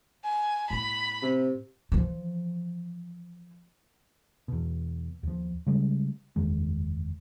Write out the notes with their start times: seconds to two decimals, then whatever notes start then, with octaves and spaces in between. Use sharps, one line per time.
0.25 G#5
0.70 A2 B3 B5
1.22 C3
1.92 E3 F3
4.48 E2 B2
5.23 D#2 F3
5.66 C#3 G3 G#3
6.36 F#1 E2 D#3 G#3